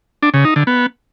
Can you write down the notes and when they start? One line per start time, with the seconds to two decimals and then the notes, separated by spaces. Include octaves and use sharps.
0.23 D4
0.34 C#3
0.45 D#4
0.56 D3
0.67 B3